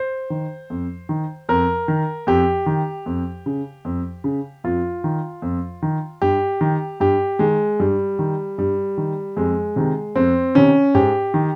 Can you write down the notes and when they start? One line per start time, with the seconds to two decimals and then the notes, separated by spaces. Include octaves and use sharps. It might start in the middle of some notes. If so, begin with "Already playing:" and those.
Already playing: C5
0.30 D#3
0.70 F2
1.09 D#3
1.49 F2 A#4
1.88 D#3
2.27 F2 G4
2.66 D#3
3.06 F2
3.46 C#3
3.85 F2
4.24 C#3
4.64 F2 F4
5.04 D#3
5.42 F2
5.82 D#3
6.22 G2 G4
6.61 D#3
7.00 G2 G4
7.39 D#3 G#3
7.80 G2 G3
8.19 D#3
8.58 G2 G3
8.98 D#3
9.36 F2 G#3
9.76 C3 D#3
10.15 F2 C4
10.55 C3 D#3 C#4
10.95 G#2 G4
11.34 D#3